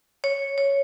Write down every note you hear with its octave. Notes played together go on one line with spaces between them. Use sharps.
C#5
C#5